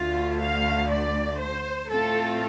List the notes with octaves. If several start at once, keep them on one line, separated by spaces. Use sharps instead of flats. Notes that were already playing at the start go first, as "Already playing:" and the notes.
Already playing: D2 D3 A3 F4
F5
D5
C5
A2 A3 C4 F4 A4